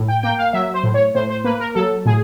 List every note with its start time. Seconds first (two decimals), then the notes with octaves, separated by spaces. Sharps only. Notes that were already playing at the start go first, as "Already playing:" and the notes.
Already playing: A2
0.08 G5
0.23 A#3 G5
0.38 F5
0.53 F#3 E5
0.74 C5
0.84 A2
0.94 C#5
1.15 A2 C5
1.30 C5
1.44 A#3 B4
1.60 A#4
1.75 F#3 A4
2.06 A2 G#4